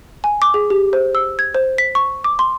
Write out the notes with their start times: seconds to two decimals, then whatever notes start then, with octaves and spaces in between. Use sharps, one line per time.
0.24 G#5
0.42 D6
0.54 G#4
0.70 G4
0.93 C5
1.15 E6
1.39 G#6
1.55 C5
1.78 B6
1.95 C#6
2.24 D6
2.39 C6